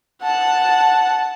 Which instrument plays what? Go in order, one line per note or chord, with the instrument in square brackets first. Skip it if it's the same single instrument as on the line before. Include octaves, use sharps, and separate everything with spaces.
[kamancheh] F#5 A5